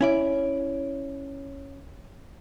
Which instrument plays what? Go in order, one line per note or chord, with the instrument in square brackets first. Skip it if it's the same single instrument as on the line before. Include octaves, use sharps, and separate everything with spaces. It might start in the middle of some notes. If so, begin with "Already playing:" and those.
[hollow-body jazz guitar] C#4 E4 D5